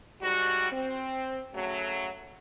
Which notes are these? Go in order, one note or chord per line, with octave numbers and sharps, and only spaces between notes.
G#2 G3 F#4
C4
C#3 F#3 A3